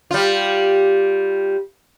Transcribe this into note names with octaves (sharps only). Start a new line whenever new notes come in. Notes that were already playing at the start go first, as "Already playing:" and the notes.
G3 F4